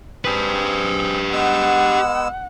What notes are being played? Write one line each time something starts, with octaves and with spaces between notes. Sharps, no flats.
C4 G4 G#4 B4
G#3 B3 F#5 E6